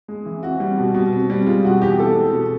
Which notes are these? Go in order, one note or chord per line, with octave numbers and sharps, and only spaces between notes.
G#3
E3
C4 F#4
G3
B2
B2
C4
G3
G#3 F4
B2 F#4
E2 G4
C4 A4
G#3
B2